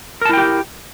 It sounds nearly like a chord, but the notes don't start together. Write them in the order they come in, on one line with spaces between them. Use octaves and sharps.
A#4 A5 E4 G5 G4